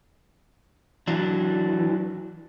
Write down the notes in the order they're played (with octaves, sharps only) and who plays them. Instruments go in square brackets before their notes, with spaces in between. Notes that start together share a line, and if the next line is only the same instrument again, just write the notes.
[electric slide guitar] E3 F#3 D4